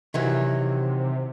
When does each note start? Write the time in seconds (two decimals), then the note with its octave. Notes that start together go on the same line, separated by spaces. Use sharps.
0.14 C3 D#3 E3 F#3